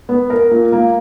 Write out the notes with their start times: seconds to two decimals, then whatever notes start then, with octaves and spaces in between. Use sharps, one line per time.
0.09 B3
0.30 A#4
0.51 A#2
0.72 A#3